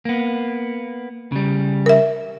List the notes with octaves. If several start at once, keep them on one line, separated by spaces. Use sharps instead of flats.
A#3 B3
C#3 G3
A#4 E5